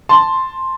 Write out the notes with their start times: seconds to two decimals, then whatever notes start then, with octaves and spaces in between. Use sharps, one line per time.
0.09 A5 C6